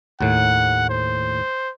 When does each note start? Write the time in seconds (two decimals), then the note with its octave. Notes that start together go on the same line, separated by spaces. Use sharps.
0.21 D#2 A2 F#5
0.90 C5